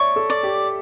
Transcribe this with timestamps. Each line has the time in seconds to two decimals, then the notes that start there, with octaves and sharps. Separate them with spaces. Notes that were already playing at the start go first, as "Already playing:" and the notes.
Already playing: C#5 D5 E5 C#6
0.16 A4
0.30 D5
0.43 G4